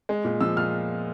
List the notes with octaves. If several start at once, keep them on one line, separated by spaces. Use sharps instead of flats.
G#3
A#2
F3 E6
A#2 F6